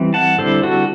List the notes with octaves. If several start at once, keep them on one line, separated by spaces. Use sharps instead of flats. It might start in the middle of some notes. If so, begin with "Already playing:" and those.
Already playing: E3 G3 C4
F#5 A5
D3 G3 C4 E4 A4 C5
F#4 A4